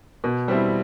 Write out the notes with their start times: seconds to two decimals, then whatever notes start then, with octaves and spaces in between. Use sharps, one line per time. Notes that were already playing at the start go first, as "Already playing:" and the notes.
0.24 B2
0.48 G3 C4 E4